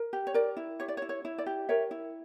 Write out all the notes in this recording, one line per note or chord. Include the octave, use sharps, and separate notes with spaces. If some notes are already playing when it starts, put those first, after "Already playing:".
Already playing: A#4
G4
C#5
A#4 D5
E4
G4 C#5
D5
C#5
E4
C#5
E4
D5
G4
A#4 C#5 E5
E4